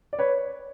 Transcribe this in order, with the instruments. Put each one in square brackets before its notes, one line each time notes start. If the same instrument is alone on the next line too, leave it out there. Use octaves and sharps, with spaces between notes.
[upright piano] D5
B4 C#5